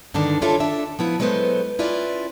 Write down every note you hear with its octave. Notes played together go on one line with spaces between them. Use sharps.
G2 D3 D#3 B3 D4
D4 E4 F4 A4 C#5 E5
D4 E5
F3 B3 E4 F#5
F#3 G#3 A3 B3 B4 C5
C#4 E4 F4 B4 D5